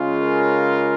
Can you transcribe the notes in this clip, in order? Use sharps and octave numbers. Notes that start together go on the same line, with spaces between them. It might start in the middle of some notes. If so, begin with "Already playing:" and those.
Already playing: C#3 G#3 C#4 F4
A#4